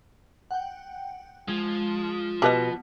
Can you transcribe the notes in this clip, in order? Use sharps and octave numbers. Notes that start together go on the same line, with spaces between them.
F#5 G5
F3 G#3
B2 G4 B4 D#5